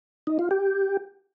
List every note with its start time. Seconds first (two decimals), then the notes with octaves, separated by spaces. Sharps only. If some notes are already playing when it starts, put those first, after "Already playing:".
0.27 D#4
0.39 F4
0.51 G4